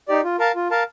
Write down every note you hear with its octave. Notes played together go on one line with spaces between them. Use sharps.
D#4 G4 D5
F4
A#4 F5 A5
F4
A#4 F5 A5